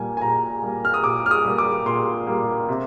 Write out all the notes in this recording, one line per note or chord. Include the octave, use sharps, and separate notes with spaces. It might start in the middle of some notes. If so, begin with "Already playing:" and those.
Already playing: A#2 G3 A#3 G#5
G#5
A#2 A#5
G3 A#3
F6
D#6
A#2 D6
F6
D#6
G3 A#3
D6
A#2 C6
G3 A#3
C3